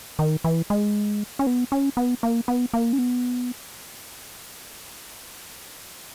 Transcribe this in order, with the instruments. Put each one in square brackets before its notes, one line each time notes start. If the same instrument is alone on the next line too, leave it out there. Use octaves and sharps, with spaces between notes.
[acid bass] D#3
E3
G#3
C#4
B3
C#4
B3
A#3
B3
A#3
C#4
B3